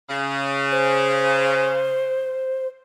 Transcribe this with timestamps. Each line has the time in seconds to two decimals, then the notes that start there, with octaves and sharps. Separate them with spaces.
0.09 C#3
0.72 C5